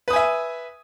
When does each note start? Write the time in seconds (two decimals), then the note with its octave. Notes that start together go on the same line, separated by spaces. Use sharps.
0.08 B4
0.10 D#6
0.13 G#5
0.16 E5